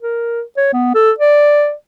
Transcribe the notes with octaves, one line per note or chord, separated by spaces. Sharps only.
A#4
C#5
B3
A4
D5